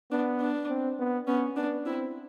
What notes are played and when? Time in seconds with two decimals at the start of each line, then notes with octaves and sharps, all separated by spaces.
0.12 B3 D4
0.41 D4
0.70 C4
0.99 B3
1.27 B3 C#4
1.56 B3 D4
1.86 C4 E4